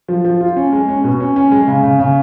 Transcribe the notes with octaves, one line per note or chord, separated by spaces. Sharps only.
F3
F3
F4
C#4
G#3
C#4
B2
C#4
C#4
G#3
C#3
C#3
C#3